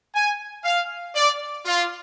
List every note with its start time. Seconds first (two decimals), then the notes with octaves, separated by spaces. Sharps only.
0.15 G#5
0.64 F5
1.15 D5
1.66 F4